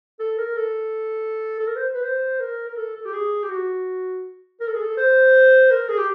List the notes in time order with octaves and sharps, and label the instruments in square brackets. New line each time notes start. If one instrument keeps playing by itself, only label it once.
[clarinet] A4
A#4
A4
A4
A#4
C5
B4
C5
A#4
A#4
A4
A4
G4
G#4
G4
F#4
A#4
A4
G#4
A4
C5
A#4
G#4
G4